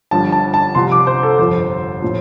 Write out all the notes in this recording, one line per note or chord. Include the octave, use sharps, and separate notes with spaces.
G1 G2 F3 A5
A5
A5
C2 C3 F3 C6
D6
C5
A4
G1 F2 F3 C5
A2 F3